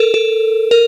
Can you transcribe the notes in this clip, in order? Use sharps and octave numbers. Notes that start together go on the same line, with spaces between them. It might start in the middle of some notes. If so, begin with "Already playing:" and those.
Already playing: A4 A#4
A4
A#4